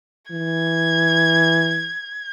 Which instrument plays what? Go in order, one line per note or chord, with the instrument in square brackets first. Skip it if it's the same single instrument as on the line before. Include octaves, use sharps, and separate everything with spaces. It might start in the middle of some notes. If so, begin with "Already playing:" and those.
[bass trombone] E3 [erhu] G#6